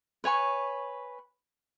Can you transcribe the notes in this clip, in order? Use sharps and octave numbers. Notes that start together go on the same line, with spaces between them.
B4 C#5 G#5 C#6